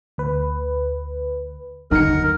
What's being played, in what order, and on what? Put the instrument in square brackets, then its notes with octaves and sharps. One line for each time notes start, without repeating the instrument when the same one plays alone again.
[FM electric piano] D2 B4
[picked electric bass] G1 D#2 F#3 [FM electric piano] D3 [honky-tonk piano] D#3 C#7 [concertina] A#4